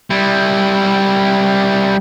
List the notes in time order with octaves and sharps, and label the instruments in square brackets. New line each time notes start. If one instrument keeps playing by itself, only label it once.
[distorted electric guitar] G3 E4